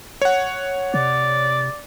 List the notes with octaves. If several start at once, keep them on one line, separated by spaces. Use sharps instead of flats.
C#5 F#5
C3 D5